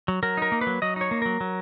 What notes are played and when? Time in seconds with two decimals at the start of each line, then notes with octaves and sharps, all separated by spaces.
0.08 F#3
0.23 F#3 A#4
0.37 D#4 A#4
0.52 A#3
0.61 B4
0.67 F#3
0.82 F#3 D#5
0.96 D#4 C#5
1.11 A#3
1.22 F#3 A#4
1.41 F#3